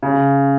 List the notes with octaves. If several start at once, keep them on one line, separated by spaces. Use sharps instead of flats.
C#3